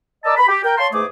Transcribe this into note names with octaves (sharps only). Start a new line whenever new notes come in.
A#4 D5 D#5 A5 D6 E6
B5
G4
A#4 G5
C#5 F5 A5 C6
E2 G#2 A3 G#4 D6